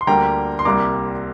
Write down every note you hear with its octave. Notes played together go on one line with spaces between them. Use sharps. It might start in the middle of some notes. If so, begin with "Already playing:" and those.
C6
D2 D3 G3 A#3 G5 A#5
C6
C2 C3 G3 A#3 A#5 D6